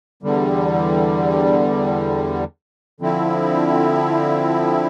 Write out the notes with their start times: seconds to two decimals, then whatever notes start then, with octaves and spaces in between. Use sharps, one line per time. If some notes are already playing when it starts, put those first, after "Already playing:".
0.23 E2 D3 G3
3.01 D3 F3 C4 E4